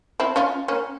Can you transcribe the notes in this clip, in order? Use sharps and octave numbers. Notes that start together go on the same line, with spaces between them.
C4 E4
C#4 F4
A#3 C#4